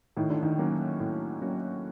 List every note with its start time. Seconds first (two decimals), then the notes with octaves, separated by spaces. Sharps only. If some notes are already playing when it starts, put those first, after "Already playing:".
0.17 A2 D#3
0.30 D3
0.43 D#3
0.58 F#3 A#3 C#4 F#4
1.00 A2
1.41 F#3 A#3 C#4 F#4